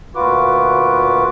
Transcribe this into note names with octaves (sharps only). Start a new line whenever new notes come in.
D2 A#2 F4 F#4 B4 D6